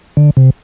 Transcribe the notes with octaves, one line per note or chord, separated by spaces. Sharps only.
D3
C3